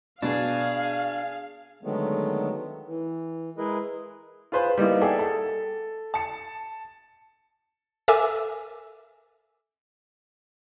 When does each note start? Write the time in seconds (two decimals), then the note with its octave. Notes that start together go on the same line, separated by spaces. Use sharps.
0.22 B2 D4 G#4 F5
1.83 D3 D#3 F#3 G#3 A3 B3
2.86 E3
3.58 G#3 E4 G#4 A#4 B4 D#5
4.52 F4 G#4 B4 C5
4.77 G3 A#3 B3 D#4 E4
5.01 G#4 A4 D5 E5 F#5 G5
5.19 A4
6.14 A5 C#7
8.08 A4 A#4 E5 G#5 D6 E6